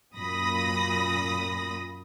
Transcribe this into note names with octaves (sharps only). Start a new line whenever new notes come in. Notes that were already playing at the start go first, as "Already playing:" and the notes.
F#2 A#2 B5 D#6 A#6